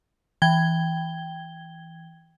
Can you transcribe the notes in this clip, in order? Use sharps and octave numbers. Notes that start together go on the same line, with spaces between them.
E3 G5 G#6 G7